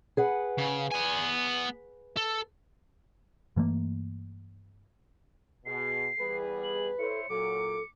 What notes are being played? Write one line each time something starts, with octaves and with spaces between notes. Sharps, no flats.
G#4 B4 F#5
C#3
B3 G#5
A4
G2 E3 A3 A#3
B2 G#4 C7
E2 G3 G#4 B4
F#7
E4 A4 C5 C#5 C#7
A#2 F#3 A4 D6